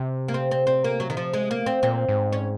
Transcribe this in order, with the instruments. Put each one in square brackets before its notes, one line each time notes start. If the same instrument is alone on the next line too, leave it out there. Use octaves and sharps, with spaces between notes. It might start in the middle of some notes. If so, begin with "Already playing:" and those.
Already playing: [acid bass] C3
[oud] A#3
C4
C4
C4
A#3
F#3
D#3
F3
G#3
A#3
C4
[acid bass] A#2 [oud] C4
[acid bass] G#2
[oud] C#4